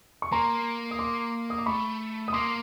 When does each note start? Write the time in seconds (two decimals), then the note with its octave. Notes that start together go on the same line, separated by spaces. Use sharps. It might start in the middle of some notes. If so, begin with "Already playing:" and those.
0.22 C#6
0.32 A#3 A#5 C6
0.91 D#6
0.99 C6 D6
1.50 D#6
1.58 D6
1.66 A3 B5 C#6
2.28 D#6
2.33 A#3 C6 D6